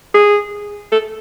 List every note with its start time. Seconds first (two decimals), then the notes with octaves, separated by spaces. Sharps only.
0.14 G#4
0.92 A4